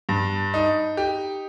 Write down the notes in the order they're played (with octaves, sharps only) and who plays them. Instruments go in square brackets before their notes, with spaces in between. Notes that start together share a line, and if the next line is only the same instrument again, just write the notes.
[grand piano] G2
D#4
G4